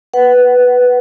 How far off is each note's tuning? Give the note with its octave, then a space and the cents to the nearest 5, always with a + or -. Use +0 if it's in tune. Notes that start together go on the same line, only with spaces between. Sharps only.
B4 +0 F#5 +20